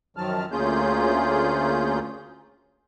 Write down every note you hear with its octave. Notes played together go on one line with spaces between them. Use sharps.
F#2 D#3 F3 F#3 A5 F6
D2 A#3 C#4 F4 G#4 G6